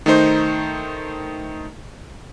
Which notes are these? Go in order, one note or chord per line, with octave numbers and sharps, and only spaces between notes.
D#3 A3 D#4 C5